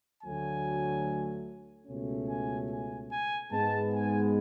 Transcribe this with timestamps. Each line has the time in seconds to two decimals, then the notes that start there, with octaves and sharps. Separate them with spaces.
0.22 D2 D3 F#3 A3 G#5
1.87 C#2 B2 A3 C#4
2.29 G#5
2.69 G#5
3.10 G#5
3.51 G#2 G#3 B3 A5
3.92 G#5